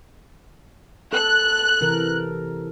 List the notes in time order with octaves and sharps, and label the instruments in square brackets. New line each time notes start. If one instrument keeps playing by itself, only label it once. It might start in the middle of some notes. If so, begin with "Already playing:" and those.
[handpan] A4 [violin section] F#6
[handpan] C3 E3 A#4